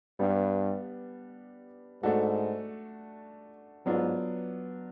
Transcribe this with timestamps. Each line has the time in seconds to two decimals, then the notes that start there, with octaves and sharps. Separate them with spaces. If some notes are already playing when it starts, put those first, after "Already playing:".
0.20 G2 G3 B3 D4
2.03 G#2 A3 D4 F#4 A4
3.86 G#2 F#3 B3 D4 F4